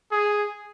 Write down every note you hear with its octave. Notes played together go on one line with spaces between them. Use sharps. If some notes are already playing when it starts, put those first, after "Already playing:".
G#4